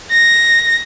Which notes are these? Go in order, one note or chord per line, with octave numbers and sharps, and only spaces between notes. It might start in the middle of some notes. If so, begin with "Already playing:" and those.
A#6